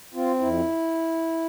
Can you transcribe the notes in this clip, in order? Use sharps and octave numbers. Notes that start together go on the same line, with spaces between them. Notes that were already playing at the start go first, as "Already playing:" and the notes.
C4 F4
F2 E4